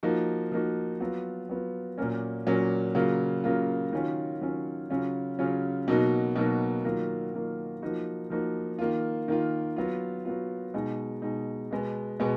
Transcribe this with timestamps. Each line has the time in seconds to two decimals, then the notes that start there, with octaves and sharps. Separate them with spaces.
0.03 F3 A#3 D#4 F#4
0.52 F3 A#3 D#4 F#4
1.00 F#3 B3 F4
1.49 F#3 B3 F4
1.98 A#2 F#3 A#3 C#4
2.47 A#2 F#3 A#3 C#4
2.95 C#3 F#3 A#3 F4
3.44 C#3 F#3 A#3 F4
3.92 D#3 F#3 C#4 F4
4.41 D#3 F#3 C#4 F4
4.90 C#3 F#3 C#4 F4
5.39 C#3 F#3 C#4 F4
5.88 B2 F#3 A#3 D#4 F#4
6.35 B2 F#3 A#3 D#4 F#4
6.84 D#3 F#3 A#3 F4
7.34 D#3 F#3 A#3 F4
7.82 F3 A#3 D#4 F#4
8.30 F3 A#3 D#4 F#4
8.79 D#3 A#3 F4
9.28 D#3 A#3 F4
9.76 F#3 B3 F4
10.25 F#3 B3 F4
10.74 B2 G#3 D#4
11.22 B2 G#3 D#4
11.71 B2 G#3 B3
12.20 B2 G#3 B3